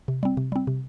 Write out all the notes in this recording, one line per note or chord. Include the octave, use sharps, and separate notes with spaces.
C3
G3 C4
C3
G3 C4
C3